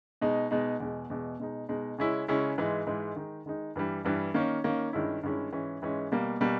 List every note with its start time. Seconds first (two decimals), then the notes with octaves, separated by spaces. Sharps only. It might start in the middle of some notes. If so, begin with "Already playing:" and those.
0.21 B2 G#3 D#4
0.51 B2 G#3 D#4
0.80 E2 B2 G#3
1.10 E2 B2 G#3
1.40 B2 G#3 D#4
1.69 B2 G#3 D#4
1.98 C#3 G#3 C#4 E4
2.28 C#3 G#3 C#4 E4
2.58 G#2 E3 G#3
2.87 G#2 E3 G#3
3.16 D#3 G#3 D#4
3.46 D#3 G#3 D#4
3.76 G2 E3 G3
4.05 G2 E3 G3
4.34 D#3 A#3 C#4
4.64 D#3 A#3 C#4
4.93 G2 D#3 G#3 C#4 E4
5.23 G2 D#3 G#3 C#4 E4
5.53 G#2 E3 G#3 C#4
5.82 G#2 E3 G#3 C#4
6.12 B2 G3 A#3
6.41 B2 G3 A#3